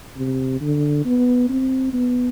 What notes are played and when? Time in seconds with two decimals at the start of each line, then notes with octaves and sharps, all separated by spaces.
0.17 C3
0.61 D3
1.05 B3
1.49 C4
1.93 B3